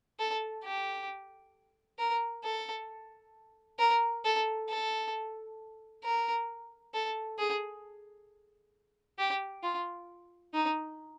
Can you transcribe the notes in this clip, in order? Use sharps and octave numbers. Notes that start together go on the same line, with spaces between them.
A4
G4
A#4
A4
A#4
A4
A4
A#4
A4
G#4
G4
F4
D#4